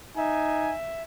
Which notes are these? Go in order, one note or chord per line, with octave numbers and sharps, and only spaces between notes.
D#4 E5 G#5